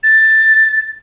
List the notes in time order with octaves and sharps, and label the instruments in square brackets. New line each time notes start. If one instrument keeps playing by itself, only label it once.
[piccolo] A6